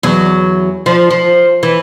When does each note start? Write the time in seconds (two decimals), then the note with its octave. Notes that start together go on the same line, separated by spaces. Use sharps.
0.03 E2 F#3
0.86 F3
1.10 F3
1.63 E3